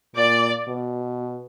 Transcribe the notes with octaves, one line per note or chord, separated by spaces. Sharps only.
A#2 D5
B2